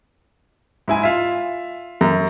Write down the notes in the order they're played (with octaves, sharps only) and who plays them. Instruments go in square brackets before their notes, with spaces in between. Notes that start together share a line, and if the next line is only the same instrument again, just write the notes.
[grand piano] G#2 E4 G#5
F4 E5
[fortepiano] F#2